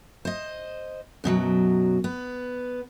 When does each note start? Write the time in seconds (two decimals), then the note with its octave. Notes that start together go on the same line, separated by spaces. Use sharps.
0.25 C5 D#5
1.24 F#2 B2 F3 F#3
2.04 B3